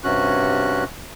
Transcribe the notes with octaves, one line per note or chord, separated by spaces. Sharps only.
G2 C3 C#4 F#4 F#6